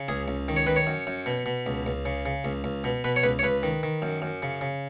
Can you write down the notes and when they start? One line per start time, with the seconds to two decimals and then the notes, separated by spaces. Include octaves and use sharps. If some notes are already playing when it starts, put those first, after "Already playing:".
Already playing: C#3
0.08 C#2 G#4
0.28 C#2
0.48 D#3
0.57 C#5
0.67 D#3 B4
0.76 C#5
0.87 F#2
1.07 F#2
1.26 B2
1.46 B2
1.66 C#2
1.86 C#2
2.05 C#3
2.26 C#3
2.45 C#2
2.64 C#2
2.84 B2
3.04 B2 B4
3.16 C#5
3.23 C#2 B4
3.39 C#5
3.43 C#2 B4
3.63 D#3
3.83 D#3
4.02 F#2
4.22 F#2
4.42 C#3
4.61 C#3